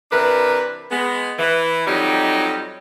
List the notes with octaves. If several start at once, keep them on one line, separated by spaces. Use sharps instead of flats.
C3 E3 D4 A#4 B4
G#3 B3
E3
F2 F#3 G3 D#4 G4